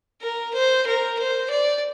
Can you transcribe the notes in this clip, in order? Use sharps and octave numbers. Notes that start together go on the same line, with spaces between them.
A#4
C5
A#4
C5
D5